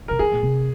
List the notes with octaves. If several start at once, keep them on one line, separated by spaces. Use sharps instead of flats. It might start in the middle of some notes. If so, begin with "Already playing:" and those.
C#3 A#4
D#3 G#4
A#2
C3